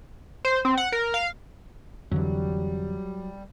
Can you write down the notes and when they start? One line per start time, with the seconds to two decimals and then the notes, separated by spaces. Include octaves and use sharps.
0.45 C5
0.65 C4
0.77 F#5
0.92 A#4
1.14 F5
2.12 F2 D3 E3 F#3 G3